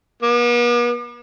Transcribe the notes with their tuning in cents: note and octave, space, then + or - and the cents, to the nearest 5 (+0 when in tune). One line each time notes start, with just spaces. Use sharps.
B3 -45